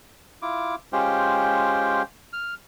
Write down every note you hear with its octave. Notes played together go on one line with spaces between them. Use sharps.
E4 F4 D6
G#3 C#4 F4 G4 C5 G5
F6